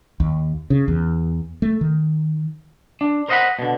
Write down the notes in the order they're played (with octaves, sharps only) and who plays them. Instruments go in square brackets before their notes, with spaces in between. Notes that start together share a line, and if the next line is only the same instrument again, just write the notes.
[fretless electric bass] D#2
C#3
E2
A3
D#3
[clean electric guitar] D4
A#4 C5 D#5 F5 F#5 B5
B2 D3